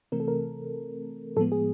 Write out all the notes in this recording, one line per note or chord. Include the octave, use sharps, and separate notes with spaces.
C3 E3 A3 C4 A#4
A4
A#4
A2 F3 G#3 B3 A4
G#4